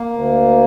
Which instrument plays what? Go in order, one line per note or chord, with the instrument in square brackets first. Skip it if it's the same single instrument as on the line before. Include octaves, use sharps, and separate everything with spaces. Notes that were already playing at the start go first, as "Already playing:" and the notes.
Already playing: [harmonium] A#3
D2